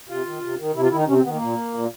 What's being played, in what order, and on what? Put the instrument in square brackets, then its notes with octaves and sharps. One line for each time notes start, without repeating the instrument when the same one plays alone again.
[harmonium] C3 F4
D#3
C3
D#3
C3 E4
F4
D#3 E4
D#4
C3 C#4
C4
D#3 B3
A#3
A#2
A#2